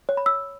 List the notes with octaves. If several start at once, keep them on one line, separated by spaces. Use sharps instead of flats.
C#5
B5
E6